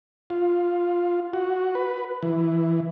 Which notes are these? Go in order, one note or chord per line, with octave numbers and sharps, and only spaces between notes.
F4
F#4
B4
E3